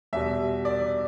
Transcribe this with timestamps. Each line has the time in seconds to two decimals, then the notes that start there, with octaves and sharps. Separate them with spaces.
0.13 E2 B2 G3 E5
0.65 D5